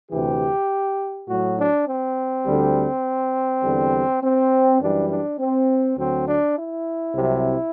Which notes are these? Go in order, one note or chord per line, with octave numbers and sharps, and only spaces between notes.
D2 C3 E3 G4
A2 F#3 F#4
D4
C4
D2 D3 G3
E2 D3 G3
C4
F#2 E3 G3 D4
D4
C4
D2 D3 F#3 C4
D4
E4
C2 C3 F#3